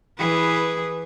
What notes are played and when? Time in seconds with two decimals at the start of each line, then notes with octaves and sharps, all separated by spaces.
0.18 E3 G#4 B4